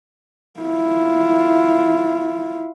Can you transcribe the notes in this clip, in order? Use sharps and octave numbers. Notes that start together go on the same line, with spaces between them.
E4 F4